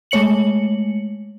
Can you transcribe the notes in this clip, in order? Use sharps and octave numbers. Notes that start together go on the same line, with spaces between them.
G#3 A3 C#5 C#7 F#7